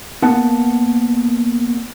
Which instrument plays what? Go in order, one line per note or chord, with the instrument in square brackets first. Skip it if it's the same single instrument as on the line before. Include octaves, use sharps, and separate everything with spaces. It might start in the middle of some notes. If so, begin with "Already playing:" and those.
[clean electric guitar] A#3 B3 F#5 A5